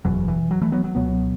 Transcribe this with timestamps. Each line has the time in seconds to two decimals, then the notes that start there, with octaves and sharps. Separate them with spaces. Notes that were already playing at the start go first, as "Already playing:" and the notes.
0.05 F#1 E2 B2 F#3
0.28 E3
0.51 F#3
0.62 E3 A3
0.72 F#3 B3
0.84 F#3
0.95 C#2 B2 F#3 B3